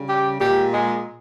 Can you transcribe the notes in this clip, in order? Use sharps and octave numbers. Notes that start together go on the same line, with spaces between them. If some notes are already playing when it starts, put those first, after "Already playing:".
Already playing: C#3 G3
G4
A#2 G#3 G4
G#3